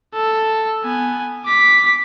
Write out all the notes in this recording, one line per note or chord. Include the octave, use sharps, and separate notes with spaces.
A4
B3 G#5
D6 B6